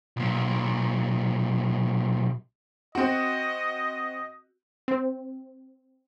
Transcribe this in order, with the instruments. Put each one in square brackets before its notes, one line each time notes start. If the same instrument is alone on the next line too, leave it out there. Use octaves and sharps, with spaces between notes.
[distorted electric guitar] B1 A#2
[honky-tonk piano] C4 F#4 [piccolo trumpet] D#5
[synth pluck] C4